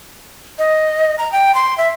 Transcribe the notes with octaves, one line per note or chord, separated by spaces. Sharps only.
D#5
A#5
G5
C6
E5